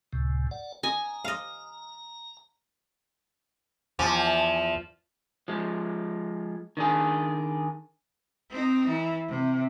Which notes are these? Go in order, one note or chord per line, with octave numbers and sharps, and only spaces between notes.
C#2 A2 C3
D5 F#5
D#5 G#5 A#5
D#5 F5
E2 F3 G#5 A5 D6
F3 G#3
D#3 D4 G#4
C4 D#4
E3
C3